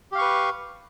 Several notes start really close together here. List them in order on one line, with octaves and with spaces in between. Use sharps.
G4 F5 C#6 B4